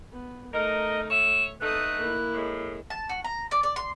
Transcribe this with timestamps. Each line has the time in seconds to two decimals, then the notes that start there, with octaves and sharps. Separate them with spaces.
0.12 B3
0.54 A3 D#4 A#4 D#5
1.10 C#5 E5 E7
1.61 A3 B3 D#4 A4 D#6 F#6
2.00 A#3 E4
2.34 A2 G#3
2.90 A5
3.09 F#4
3.25 A#5
3.51 D5
3.63 D5
3.76 C6